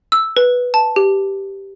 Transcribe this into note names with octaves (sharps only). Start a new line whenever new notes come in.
E6
B4
A5
G4